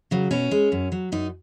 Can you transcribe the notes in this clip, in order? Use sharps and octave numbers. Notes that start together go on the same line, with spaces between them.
C#3 F#3
B2 C#4
G#3
F#2
F#3
F#2 D#4